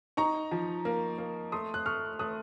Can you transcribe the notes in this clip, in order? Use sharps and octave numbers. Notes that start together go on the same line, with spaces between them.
D#4 A#5 C#6
F3
A#3
A#3
A3 C6 D#6
F#6
A3 C#6 F6
A3 D#6 F#6